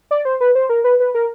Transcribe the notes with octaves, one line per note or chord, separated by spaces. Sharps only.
D5
C5
B4
C5
A#4
B4
B4
A#4